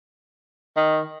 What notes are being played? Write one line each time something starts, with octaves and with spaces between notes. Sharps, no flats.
D#3